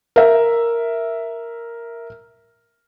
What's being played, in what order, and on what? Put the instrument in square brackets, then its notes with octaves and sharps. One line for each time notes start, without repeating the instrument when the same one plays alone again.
[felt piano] A#4 E5